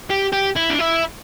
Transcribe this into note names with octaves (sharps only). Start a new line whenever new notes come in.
G4
G4
E4
D4
E4